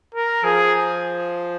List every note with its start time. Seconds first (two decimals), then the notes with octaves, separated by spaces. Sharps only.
0.14 A#4
0.43 F3 G#4